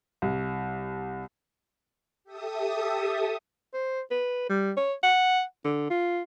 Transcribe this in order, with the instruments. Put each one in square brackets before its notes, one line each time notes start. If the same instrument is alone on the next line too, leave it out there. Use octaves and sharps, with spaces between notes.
[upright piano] C2
[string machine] G4 A4 E5 D#6
[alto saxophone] C5
B4
G3
C#5
F#5
D3
F4